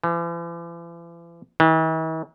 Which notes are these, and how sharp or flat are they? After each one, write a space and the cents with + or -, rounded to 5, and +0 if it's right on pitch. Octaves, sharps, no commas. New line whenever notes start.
E3 +45
E3 -45